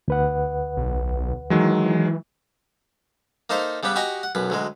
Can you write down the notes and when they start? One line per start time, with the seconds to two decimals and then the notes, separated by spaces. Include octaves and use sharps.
0.08 D2 B4 F#5
0.77 B1
1.50 D#3 E3 F#3 G#3
3.50 A#3 D#4 A4 C5 E5 F5
3.83 C#3 G3 B3 G4 B4
3.96 F#4 G4 D#5 G#5 A#5 C#6
4.23 F#5
4.35 B1 F#2 B4
4.50 D2 F#3 G#3